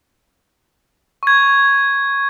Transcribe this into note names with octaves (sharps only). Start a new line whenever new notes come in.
C#6 G#6